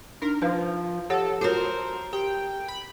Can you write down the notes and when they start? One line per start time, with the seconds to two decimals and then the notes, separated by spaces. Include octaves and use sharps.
0.22 D4 D#4 A#4
0.42 F3 B4 F5
1.10 G4 A4 C#5 F#5
1.41 F4 F#4 A4 A#4 C5 C#5
2.13 G4 G5
2.68 B5